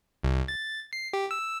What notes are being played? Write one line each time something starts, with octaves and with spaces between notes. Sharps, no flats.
C2
A6
C7
G4
E6